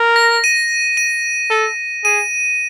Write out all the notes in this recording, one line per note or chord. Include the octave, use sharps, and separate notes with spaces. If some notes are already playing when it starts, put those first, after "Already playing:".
Already playing: A#4
A#6
D#7
D#7
A4
G#4 D#7